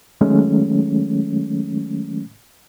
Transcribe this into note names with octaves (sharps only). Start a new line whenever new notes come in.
D#3 F#3 G#3 A3 C#4